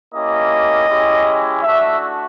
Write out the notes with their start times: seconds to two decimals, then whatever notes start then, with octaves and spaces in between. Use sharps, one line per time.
0.12 A#3 C#4 E4 G4 D#5
0.88 G#3 C#4 E4 G4
1.63 A3 D4 F#4 E5